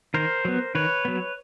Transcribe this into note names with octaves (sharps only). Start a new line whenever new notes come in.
D#3 A#4 C5
F#3 B3
D#3 B4 C#5
F#3 B3